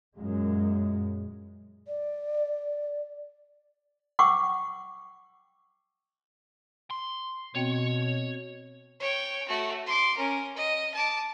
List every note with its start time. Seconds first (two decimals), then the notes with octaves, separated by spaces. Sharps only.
0.16 F#2 A#2 G#3
1.87 D5
4.19 F#5 G5 C#6 D6 E6
6.91 C6
7.55 B2 B3 C4 C#5 G5
9.00 C#5 G5
9.48 A3 F#4
9.86 C6 D6
10.17 C#4 A#4
10.56 D#5
10.94 A5 D6